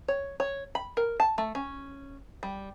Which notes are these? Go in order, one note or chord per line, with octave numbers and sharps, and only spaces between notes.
C#5
C#5
B5
A#4
A5
A3
C#4
G3